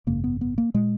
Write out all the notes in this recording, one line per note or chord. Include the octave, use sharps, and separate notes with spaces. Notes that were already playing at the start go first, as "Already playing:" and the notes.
G#1 F#2 C#3 A#3
B3
B3
A#3
A#2 G#3